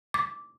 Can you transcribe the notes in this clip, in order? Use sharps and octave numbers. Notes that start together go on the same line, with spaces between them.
D6